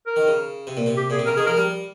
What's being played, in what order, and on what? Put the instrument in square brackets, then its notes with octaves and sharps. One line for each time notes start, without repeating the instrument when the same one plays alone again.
[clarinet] A#4
[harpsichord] D#3
C#3
C3
A#2
C3
[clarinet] G4
[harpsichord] A#2 [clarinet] G#4
[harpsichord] C3
[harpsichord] C#3 [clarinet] A#4
[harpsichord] D#3 [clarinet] G#4
[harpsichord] F3 [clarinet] A#4
[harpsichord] G3